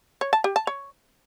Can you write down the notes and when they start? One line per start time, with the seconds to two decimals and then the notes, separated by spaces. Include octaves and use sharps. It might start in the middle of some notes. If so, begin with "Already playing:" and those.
0.21 C#5
0.33 A5
0.44 G4
0.56 A5
0.67 C#5